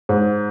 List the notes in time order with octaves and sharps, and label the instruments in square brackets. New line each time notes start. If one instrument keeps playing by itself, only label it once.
[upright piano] G#2